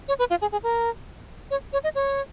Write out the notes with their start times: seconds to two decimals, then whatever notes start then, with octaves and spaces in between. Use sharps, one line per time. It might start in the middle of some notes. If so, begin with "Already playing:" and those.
0.08 C#5
0.19 B4
0.30 F4
0.41 G#4
0.52 G#4
0.63 A#4
1.51 C#5
1.73 C#5
1.84 D#5
1.95 C#5